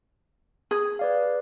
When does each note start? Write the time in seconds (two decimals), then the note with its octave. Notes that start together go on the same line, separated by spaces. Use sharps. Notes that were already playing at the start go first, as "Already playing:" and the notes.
0.71 G#4
0.99 B4 D5 F5